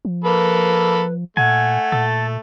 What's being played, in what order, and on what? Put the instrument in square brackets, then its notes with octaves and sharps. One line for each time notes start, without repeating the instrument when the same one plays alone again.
[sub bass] F3
[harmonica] A#3 A4 B5 [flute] B4
[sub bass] A#2 [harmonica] A3 [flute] F#5 [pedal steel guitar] G#5
[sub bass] A#2 [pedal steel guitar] A4